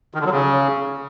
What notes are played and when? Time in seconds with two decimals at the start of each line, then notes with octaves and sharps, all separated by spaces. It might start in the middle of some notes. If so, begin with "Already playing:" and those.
0.14 D#3
0.20 D3
0.26 F#3
0.32 C#3